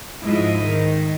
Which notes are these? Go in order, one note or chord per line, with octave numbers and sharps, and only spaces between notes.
G#2 F3 E4 D#5
D#3